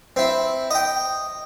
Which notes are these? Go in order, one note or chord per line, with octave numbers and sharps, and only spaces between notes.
C4 E4
D#5 G5